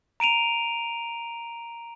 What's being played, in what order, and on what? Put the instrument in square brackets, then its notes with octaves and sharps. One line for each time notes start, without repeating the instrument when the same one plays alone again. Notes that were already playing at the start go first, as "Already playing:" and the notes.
[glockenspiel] A#5 D7 D#7 F7